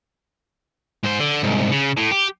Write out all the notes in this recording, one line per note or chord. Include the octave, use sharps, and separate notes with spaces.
G#2 C5
D3
C2 G#2
C#3
A2
G4